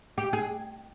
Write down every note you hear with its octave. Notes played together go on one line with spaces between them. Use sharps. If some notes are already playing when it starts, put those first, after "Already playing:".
G4
G#4